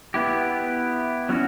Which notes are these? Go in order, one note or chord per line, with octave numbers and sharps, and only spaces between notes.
B3 E4 G4
F#3 C#4 F#4